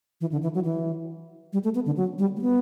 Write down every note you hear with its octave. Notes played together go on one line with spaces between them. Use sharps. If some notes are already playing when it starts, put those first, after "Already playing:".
E3
D3
E3
F#3
E3
G3
A3
B3
D3
F#3
G3
A3
B3